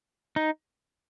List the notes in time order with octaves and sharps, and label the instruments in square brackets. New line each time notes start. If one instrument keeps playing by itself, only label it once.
[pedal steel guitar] D#4